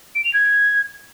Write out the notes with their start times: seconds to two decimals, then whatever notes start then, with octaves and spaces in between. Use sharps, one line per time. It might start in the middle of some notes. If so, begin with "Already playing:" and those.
0.15 D7
0.24 F7
0.34 G#6